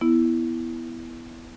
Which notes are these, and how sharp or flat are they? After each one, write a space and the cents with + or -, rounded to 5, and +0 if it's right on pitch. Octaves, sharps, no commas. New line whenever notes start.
B3 +0 E4 +0